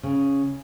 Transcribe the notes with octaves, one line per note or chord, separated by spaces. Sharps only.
C#3